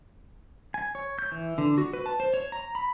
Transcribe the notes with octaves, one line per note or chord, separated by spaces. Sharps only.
G#5
C#5
G6
E3
D3
F#4
B4
A5
C5
C#5
A#5
B5